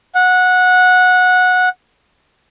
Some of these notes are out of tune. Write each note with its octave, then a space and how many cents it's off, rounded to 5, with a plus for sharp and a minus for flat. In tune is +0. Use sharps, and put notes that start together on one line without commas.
F#5 -15